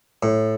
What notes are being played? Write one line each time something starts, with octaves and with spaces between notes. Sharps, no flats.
A2